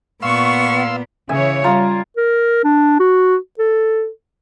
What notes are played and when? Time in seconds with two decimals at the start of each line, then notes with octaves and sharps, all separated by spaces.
0.22 A#2 B3 F5 F#5 C6 C#6 E6
1.29 C#3 E3 C#5 E5 G#5
1.64 G3 F4 A#5
2.17 A#4
2.64 D4
2.99 F#4
3.59 A4